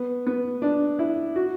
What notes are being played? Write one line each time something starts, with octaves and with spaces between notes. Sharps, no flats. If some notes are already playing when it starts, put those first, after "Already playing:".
Already playing: B3
B3
D4
E4
F#4